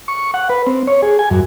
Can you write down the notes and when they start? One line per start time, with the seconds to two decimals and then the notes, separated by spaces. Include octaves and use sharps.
0.08 C#6
0.34 F#5
0.49 B4
0.67 C4
0.87 C#5
1.02 G#4
1.19 G#5
1.31 F#2